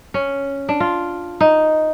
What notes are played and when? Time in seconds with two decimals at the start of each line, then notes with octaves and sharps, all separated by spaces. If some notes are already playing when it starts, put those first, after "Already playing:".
0.14 C#4
0.69 D4
0.80 F4
1.41 D#4